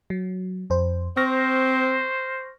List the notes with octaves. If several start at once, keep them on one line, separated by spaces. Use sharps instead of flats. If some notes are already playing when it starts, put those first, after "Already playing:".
F#3
F2 C5
C4 C5 C#6 F6 A#6